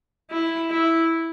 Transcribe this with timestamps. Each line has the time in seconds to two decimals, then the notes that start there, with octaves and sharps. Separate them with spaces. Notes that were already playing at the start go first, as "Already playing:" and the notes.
0.31 E4
0.70 E4